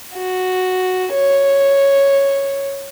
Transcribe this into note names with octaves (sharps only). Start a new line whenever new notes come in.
F#4
C#5